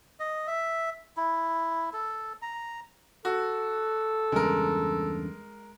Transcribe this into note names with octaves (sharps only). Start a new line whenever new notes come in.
D#5
E5
E4
A4
A#5
F#4 A4
E2 G2 C#3 G#3 A#4